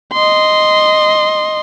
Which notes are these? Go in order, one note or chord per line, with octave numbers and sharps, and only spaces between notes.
D#5 C6